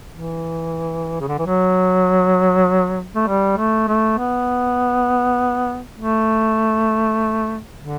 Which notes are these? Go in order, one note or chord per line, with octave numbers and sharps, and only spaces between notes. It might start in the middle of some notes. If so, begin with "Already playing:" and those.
E3
C#3
D3
E3
F#3
A3
G3
A3
A3
B3
A3
D3